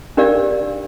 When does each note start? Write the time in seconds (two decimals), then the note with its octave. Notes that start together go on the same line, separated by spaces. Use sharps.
0.17 D4 G4 A#4 D5 F5